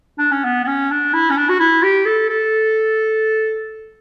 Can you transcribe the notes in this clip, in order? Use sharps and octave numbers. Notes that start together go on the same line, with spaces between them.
D4
C#4
B3
B3
C#4
D4
E4
C#4
D4
F#4
E4
G4
A4
A4